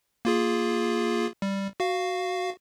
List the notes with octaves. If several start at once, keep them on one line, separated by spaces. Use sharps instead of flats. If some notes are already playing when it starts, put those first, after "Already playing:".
A#3 F4 G#4
G3
F#4 F5